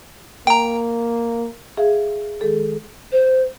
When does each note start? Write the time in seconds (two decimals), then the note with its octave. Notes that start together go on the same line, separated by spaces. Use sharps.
0.47 A#3 G5 A#5
1.77 G#4 E5 F5
2.41 D#3 G#3 G#4 A4
3.12 C5